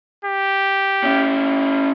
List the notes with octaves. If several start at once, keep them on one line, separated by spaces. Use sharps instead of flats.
G4
C#4 E4